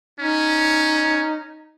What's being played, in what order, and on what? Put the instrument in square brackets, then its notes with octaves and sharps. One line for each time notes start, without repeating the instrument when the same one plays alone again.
[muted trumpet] C#4 [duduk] D#4